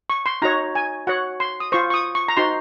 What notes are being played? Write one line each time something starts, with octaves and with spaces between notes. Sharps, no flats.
C#6
C6
D#4 F#4 C#5 A#5
G#5
F#4 C#5 F#5
C6
D#6
F4 C5 C#6
C#6
D#6
C#6
A#5
D#4 F#4 C5 C6